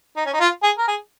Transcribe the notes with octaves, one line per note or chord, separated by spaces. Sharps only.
D#4
C#4
D#4
F4
G#4
A#4
G#4